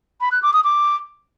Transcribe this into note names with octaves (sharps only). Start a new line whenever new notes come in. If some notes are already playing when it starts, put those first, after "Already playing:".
B5
F#6
D6
D#6
D6